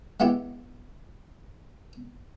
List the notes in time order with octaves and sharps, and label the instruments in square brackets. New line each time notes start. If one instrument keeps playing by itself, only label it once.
[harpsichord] G#3 B3 E4 G4